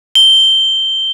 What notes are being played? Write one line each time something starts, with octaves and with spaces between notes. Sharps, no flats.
G7